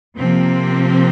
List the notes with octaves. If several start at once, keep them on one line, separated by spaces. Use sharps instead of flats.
C3 F3 A#3 C4